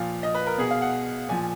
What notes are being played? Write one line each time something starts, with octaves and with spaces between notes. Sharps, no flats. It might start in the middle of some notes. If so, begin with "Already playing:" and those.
Already playing: A#2 F3 F5
D#5
B4
A#4
B2 G#4
F5
F#5
A#2 F3 G#5